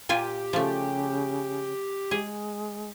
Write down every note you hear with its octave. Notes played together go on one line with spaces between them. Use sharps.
A#2 F4 G4 G#5
C#3 F3 A3
G#3 G#4